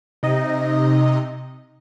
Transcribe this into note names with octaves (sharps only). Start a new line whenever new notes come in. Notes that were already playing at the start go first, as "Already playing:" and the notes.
C3 D#4 D#5